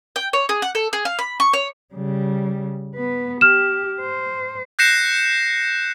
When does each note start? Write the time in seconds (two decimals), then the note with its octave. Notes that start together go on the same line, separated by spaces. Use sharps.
0.16 G5
0.33 C#5
0.49 G#4
0.62 F#5
0.75 A4
0.93 G#4
1.05 F5
1.19 B5
1.40 C#6
1.53 C#5
1.95 C#3 G3
2.96 B3 B4
3.41 G4 F6 E7
4.01 C5
4.79 F#6 G6 A#6 C7 C#7 E7